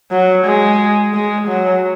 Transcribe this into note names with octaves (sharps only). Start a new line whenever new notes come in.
F#3
G#3
G#3
F#3